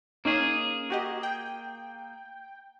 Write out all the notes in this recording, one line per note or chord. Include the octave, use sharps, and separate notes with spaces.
A#3 C#4 D#4 G#4
F#4 G4 D#5
G5